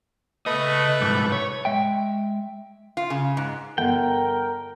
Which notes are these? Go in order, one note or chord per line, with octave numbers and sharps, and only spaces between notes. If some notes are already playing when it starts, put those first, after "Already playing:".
C#3 A3 B4 D#5
C2 G#2
C#5
G#3 E5 G5
F4
C#3
G#2
G1 A4 A#4 F#5 G5